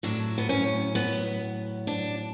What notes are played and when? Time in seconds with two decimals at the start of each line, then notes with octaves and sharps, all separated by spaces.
0.03 A2 F#3 D4
0.38 B3
0.49 C#4
0.95 B3
1.87 D4